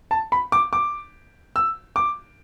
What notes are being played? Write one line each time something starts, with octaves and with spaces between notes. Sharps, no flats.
A5
B5
D6
D6
E6
D6